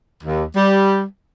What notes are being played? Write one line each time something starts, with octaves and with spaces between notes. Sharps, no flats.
D#2
G3